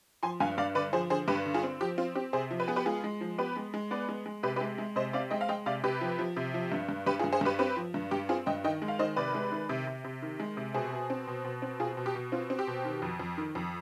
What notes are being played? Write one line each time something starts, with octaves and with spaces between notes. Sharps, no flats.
F3 G#5 C6
G2 F5 G#5
G2 D5 F5
D3 B4 D5
F3 G#4 C5
D3 G#4 C5
G2 G4 B4
D3
F4 G#4
C4
F3 G4
C4 F4
C4 G4
C3 G#4 C5
F3
B4
B3 G#4
G4 B4
G#3 F4 G#4
G#3
F3
B3 G4 B4
G#3
G#3
B3 B4 D5
G#3
G#3
C3 G4 B4
G4 B4
G#3
G#3
C3 C5 D#5
C4 D5 F5
G#3 D#5 G5
F5
G#3 D#5 G5
C3 D5 F5
C3 G4 B4
F3
F3
C3
F3
G2
G2
G2 G4 B4
F4 G#4
G2
G#4 C5
G2 G4 B4
C4 G4 B4
F3
G2
G2 G4
C4 F4 G#4
G2 D#5 G5
D#3 D#5 G5
G#3
F5
D#3 C5 D#5
C3 B4 D5
G#3
D#3
C3
C3
C3
D#3
G#3
C3
B2 G#4 C5
B2
C4
B2
B2
C4
B2 F4 G#4
B2
G4
B2
C4 F4
C4
G4
B2
D#3
F2
F2
D#3
F2